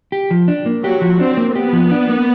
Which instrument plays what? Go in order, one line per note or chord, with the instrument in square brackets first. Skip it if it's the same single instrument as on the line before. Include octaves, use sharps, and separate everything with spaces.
[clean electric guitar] G4
F3
D4
A#3
[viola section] F#3 F#4 [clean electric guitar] G4
[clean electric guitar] F3
[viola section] C4 [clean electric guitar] D4
[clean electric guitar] A#3
[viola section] B3 [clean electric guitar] G4
[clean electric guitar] F3
D4
A#3